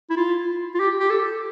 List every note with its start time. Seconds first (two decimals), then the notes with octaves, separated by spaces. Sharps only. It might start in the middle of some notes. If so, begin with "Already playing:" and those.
0.10 E4
0.17 F4
0.74 F4
0.80 G4
1.00 G4
1.10 A4